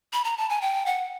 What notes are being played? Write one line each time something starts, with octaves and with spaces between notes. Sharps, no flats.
B5
A#5
A5
G#5
G5
F#5